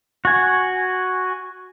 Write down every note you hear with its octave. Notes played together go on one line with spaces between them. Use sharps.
F#4 G#5